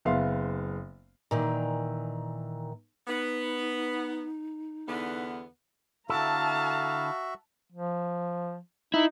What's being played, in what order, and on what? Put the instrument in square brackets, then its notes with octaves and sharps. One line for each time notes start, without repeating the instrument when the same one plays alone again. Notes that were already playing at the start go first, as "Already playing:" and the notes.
[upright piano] F#1 B3 E5 F5 C6
[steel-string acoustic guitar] A#2 D#3 E3
[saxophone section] B3 [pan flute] D#4
[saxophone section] E2 D3 B3
[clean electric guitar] D3 E4 A4 [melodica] F#4 E5 [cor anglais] F5 [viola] A5 A#5
[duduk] F3
[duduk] D#4 [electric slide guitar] E4